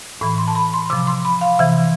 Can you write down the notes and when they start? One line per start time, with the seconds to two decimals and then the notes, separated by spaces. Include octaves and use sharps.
0.21 A2 E3 B5
0.38 C6
0.48 A5
0.55 B5
0.74 C6
0.90 C3 F3 D6
1.07 C6
1.25 B5
1.41 F5
1.59 C3 E3 E5